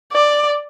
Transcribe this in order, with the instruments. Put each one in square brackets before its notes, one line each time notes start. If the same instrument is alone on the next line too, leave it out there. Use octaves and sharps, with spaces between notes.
[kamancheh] D5